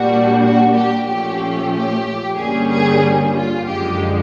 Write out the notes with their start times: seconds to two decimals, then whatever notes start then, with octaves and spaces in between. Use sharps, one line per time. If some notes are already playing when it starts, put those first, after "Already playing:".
Already playing: A#2 G3 A#3 D4 F#4
0.42 F#4
0.74 G4
1.07 A#2 F3 A3 C#4 G4
1.72 G4
2.37 G2 D3 G3 A#3 C#4 G#4
2.70 G#4
3.35 F4
3.67 F#2 D3 F3 G#3 G4